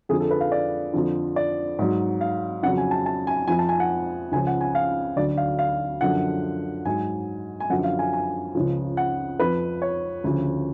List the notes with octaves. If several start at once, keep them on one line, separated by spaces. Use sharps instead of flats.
F2 D3 F3 G#4
A4
B4
F5
D5
F2 D3 F3
D5
G#2 F#3
F5
F2 C#3 F#3 F#5
G#5
A5
A5
G#5
F2 F3 G#5
A5
G#5
F#5
C#2 C#3 F3 G#5
F#5
G#5
F5
D2 D3 F#3 D5
F5
F5
F#2 D3 F3 F#5
G#2 F#3 G#5
G#5
F#2 D3 F3 F#5
F5
G#5
G#5
C#2 C#3 F3
F#5
F2 F3 B4
C#5
D2 C#3 F3